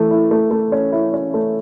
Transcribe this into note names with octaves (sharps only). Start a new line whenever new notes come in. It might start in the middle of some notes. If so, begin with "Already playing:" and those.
Already playing: E3 A3
E4
A3
A3
C#4
E4
C#4
A3